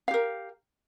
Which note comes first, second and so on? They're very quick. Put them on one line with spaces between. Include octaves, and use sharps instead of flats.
F5 G4 A#4